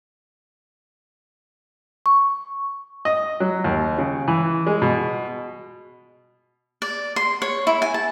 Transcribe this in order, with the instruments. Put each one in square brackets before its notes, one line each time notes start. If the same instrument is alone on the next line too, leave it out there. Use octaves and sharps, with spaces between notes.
[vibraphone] C#6
[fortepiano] D#5
F#3
D#2
C#3
E3
G#3
B2
[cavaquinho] D5
C6
C#5
E4
G#5
A5